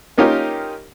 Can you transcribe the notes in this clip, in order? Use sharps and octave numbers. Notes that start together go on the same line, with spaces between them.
A#3 C#4 D#4 F4 G4 A#4